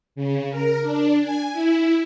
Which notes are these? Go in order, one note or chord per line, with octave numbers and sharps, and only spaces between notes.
C#3
A#4
D4
G#5
E4